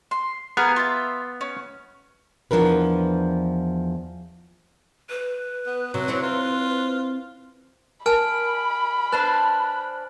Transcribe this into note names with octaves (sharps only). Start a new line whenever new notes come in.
C6
B3 G#4 A#4 F5
F4 E5
C#4
E2 F3 D4 A#4 B4
B4
B3
C3 F#3
C4 E4 C#5
F4
A#4 G#5 A5 B5 F6 D7
D4 B4 C5 A5 F#6